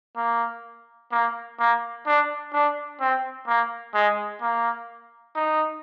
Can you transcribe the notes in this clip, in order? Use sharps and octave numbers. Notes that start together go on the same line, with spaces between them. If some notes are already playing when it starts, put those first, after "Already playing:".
A#3
A#3
A#3
D4
D4
C4
A#3
G#3
A#3
D#4